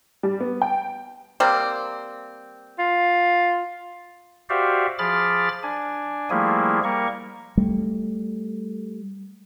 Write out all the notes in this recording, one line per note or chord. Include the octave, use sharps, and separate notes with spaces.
G3
B3
G5
G3 A#3 C4
F4
F#4 G4 C5 D5 E5 F5
F3 G#4 B5 D6 F6 A6
D4 G#5
F3 G3 A3 A#3 E4 G#4
G3 A#3 A#4 C#6
G3 A3